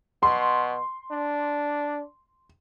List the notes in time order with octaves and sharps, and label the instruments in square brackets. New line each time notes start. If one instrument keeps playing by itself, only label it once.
[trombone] B2 [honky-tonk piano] C6
[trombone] D4